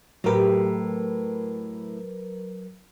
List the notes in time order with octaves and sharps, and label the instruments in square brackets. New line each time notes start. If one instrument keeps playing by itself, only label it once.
[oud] A2 G4 [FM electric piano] F#3 A#4 B4